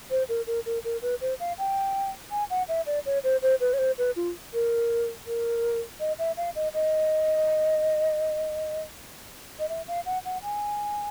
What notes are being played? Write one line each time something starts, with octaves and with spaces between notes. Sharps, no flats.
C5
A#4
A#4
A#4
A#4
B4
C5
F5
G5
G#5
F#5
E5
D5
C#5
C5
C5
B4
C#5
C5
B4
F4
A#4
A#4
D#5
E5
F5
D#5
D#5
D#5
E5
F5
F#5
F#5
G#5